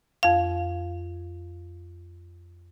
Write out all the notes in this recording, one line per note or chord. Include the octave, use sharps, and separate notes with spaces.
F2 F5